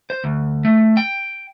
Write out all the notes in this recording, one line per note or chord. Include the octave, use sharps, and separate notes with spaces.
C5
D2
A3
G5